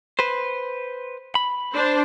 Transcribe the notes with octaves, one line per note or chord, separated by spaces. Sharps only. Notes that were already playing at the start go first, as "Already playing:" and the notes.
B4 C5
B5
D4 C5